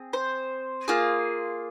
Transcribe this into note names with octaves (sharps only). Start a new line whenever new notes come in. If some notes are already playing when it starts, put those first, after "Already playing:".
Already playing: C4 G#4
C5
A#3 F4 G#4